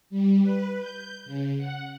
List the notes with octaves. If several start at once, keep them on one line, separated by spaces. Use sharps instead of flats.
G3
B4
G6
C#3
F#5